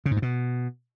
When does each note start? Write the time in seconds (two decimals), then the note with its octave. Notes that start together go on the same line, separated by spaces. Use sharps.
0.06 C#3
0.11 G#2
0.17 G2
0.22 B2